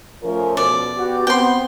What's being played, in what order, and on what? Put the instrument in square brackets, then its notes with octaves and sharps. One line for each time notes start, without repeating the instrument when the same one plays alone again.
[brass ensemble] F3 A3 C#4 [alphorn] A#4
[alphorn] B2 [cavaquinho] D5
[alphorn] B3 [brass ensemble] F#4 G4
[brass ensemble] B3 [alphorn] C4 [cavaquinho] G5 C6